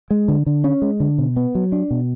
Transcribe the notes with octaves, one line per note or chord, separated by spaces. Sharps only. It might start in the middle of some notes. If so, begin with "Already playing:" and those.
G#3
D3
D3
C#4
G#3
D3
B2
B3
F#3
D4
B2